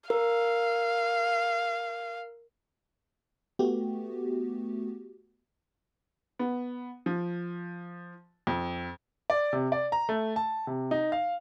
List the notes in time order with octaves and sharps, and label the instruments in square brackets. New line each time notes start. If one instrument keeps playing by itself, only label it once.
[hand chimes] A#4 [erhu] F5
[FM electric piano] A3 B3 F#4 G4
[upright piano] B3
F3
F2
[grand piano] D5
C3
D5
A#5
A3
A5
C3
D#4
F5